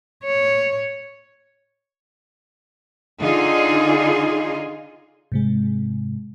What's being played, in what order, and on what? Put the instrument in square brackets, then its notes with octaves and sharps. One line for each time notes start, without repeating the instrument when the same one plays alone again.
[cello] C#5
[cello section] D3 D#4 F4 G#4
[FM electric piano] G#2 C3 G#3